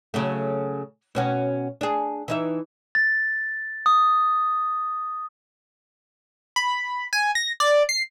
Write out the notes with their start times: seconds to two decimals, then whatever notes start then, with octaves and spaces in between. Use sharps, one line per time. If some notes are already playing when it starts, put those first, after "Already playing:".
0.14 C#3 F#3 A3
1.15 B2 C#4 F#4
1.81 D4 G#4
2.28 E3 D#4 E5
2.95 A6
3.86 D#6
6.56 B5
7.13 G#5
7.35 A#6
7.60 D5
7.89 C7